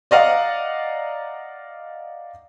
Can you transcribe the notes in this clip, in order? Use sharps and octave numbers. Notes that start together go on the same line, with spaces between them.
D5 D#5 F5 F#5 A#5